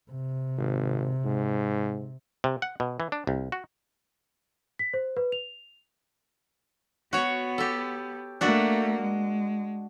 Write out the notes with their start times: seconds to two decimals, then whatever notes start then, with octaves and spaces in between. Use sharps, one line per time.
0.11 C3
0.58 G#1
1.25 G#2
2.44 C3
2.62 F#5
2.80 B2
3.00 E3
3.12 D4
3.27 C2
3.52 F#4
4.79 B6
4.94 C5
5.17 B4
5.32 F7
7.13 B3 F#4 C#5
7.58 G4 A4
8.41 A3 A#3 D4 F#4 E5
9.02 G#3